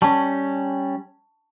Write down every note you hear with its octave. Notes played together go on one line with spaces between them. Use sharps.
G3 C#4 A5 C#6